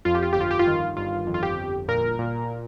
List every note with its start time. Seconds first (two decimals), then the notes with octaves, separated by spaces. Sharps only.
0.05 F2 F4
0.15 G4
0.23 F4
0.33 G1 G4
0.41 F4
0.51 G4
0.59 F4
0.67 D#3
0.97 G1 F4
1.27 F2
1.34 F4
1.43 G4
1.58 G1
1.88 A#2 A#4
2.19 A#2